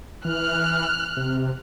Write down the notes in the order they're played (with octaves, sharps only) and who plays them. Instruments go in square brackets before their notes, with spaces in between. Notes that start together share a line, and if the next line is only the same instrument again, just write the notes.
[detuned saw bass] E3 [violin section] F6 F#6
[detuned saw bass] C3